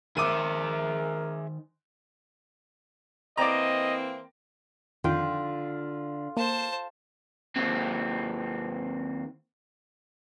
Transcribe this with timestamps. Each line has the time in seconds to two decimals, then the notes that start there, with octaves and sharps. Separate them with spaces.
0.17 D#3 G#4 A#4 C5 E5 D6 D#7
3.37 E3 A#3 C4 D5 D#5 A#5
5.04 F2 D3 D#3 F4 G5
6.37 A#3 C5 A5
7.56 D#2 C4